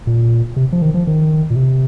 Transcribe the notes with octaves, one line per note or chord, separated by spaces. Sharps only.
A#2
C3
F3
D#3
F3
D#3
A#2
C3